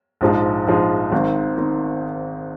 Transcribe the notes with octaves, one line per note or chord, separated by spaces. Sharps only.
A#1 G#2 F3 G#3
A#1 G#2 F3 G#3
G#1 G#2 D#3 C4
D#3 C4